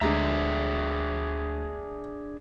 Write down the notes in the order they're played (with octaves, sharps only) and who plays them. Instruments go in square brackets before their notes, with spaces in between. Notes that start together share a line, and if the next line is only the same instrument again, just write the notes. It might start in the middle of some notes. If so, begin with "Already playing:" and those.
[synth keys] D2 [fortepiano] D3 G#3 A#5 [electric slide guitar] D4 G#4 E5